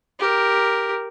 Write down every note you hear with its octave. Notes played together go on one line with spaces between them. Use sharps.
G4 A#4